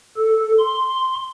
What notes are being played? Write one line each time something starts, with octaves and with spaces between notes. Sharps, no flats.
A4
C6